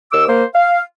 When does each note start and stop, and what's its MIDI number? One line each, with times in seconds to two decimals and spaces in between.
0.12 0.25 39
0.12 0.25 86
0.12 0.25 88
0.28 0.44 58
0.28 0.44 72
0.54 0.80 77